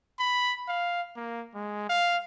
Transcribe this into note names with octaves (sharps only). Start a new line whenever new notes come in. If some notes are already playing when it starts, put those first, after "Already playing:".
B5
F5
A#3
G#3
F5